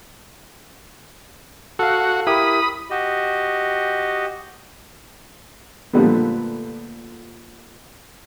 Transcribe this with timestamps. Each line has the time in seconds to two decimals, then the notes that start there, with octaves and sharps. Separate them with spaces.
1.79 F#4 A4 F5
2.27 E4 G4 A#4 B5 D#6
2.90 F#4 G4 D#5
5.93 A#2 D3 F3 G3 A3 B3